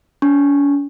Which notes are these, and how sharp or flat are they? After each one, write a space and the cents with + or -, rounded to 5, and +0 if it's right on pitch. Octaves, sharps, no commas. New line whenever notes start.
C#4 +45 C#6 -10